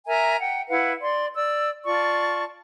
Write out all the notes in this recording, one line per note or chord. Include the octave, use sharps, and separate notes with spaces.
A#4 E5 G#5 A#5
F#5 G5
E4 B4 F5 F#5
D5 C6
D5 E6
F4 D5 A5 C#6